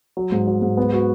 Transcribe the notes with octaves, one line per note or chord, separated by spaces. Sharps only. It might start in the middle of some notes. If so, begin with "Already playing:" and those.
F#3
G#2
F#3
G#2
B3
F#4